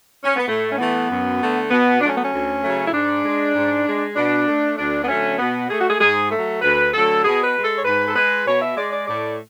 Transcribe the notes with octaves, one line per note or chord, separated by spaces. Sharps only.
C#4
B3
A2 A3
C#4
E3 A3 B3
F#2
D3 A3
B2 B3
F#3 A3 D4
C#4
B3
C#4
D2
C#3 F#3 A3
E4
G#2 D4
G#3
G#2
G#3
B2 D4
A3
D2 D4
B3
D3 F#3 A3 C#4
B2 B3
A3 G#4
F#4
G#4
G#2 G#4
F#3 A3 A4
D2 B4
D3 F#3 A3 A4
B2 G#4
B4
G#3
A4
C#5
G#2 B4
A4
G#3 B4
B2 C#5
E5
G#3 D5
D5
A2 D5